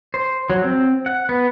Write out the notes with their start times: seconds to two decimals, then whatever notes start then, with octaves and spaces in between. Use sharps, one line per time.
0.14 C5
0.50 F#3
0.64 C4
1.06 F#5
1.29 B3